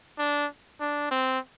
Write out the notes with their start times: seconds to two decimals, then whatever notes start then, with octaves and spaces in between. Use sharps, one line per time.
0.18 D4
0.80 D4
1.11 C4